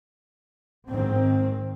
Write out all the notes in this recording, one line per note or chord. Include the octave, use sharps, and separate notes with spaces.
G#2 D#3 C4